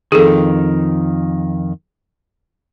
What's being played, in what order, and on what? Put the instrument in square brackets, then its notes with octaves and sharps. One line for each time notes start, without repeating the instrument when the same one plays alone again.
[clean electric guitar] F2 D#3 [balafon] G#4 A4